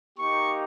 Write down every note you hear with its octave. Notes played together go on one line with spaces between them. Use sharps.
A#3 D#4 G4 C#6